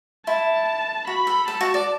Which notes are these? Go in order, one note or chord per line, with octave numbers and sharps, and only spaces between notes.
E4 A5
F#4 B5
A4
A4 A5
F#4
D5